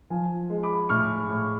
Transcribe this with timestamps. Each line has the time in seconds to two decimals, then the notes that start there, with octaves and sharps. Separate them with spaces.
0.10 F3 F5 G#5
0.50 G#3
0.63 B5 D6
0.89 A2 C#6 F6
1.29 A2